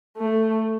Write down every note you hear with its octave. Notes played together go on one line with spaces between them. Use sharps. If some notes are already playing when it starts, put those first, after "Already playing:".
A3